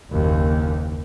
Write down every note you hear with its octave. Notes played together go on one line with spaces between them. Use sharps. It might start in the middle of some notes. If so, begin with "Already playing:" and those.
F#1 D#2